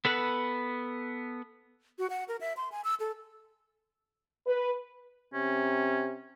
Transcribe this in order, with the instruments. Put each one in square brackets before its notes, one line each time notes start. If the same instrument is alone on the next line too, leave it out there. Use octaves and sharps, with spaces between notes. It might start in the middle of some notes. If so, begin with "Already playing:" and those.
[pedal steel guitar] B3 A4 B4 F#5
[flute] F#4
F#5
A#4
E5
C6
G#5
E6
A4
[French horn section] B4
[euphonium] C3 [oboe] C#4